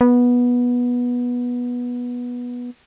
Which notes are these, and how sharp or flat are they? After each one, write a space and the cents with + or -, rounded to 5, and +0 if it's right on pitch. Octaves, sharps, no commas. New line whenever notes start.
B3 -15